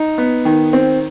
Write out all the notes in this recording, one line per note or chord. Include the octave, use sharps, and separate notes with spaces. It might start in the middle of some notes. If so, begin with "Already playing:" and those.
Already playing: D#4
B3
D#3
C4